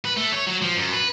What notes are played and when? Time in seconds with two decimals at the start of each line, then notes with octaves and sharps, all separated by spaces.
0.05 B4
0.17 A3
0.33 C#5
0.47 F#3
0.62 F3
0.77 F#2
0.93 B4